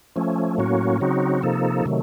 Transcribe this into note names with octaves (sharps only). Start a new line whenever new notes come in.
F3 A3 C#4
A2 F#3 A#3 C#4 F#4
C#3 F#3 C4 D#4 F#4
C3 F3 A#3 D#4 A4
C3 D#3 F#3 A3